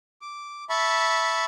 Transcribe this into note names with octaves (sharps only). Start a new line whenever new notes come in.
D6
E5 A5 B5 C#6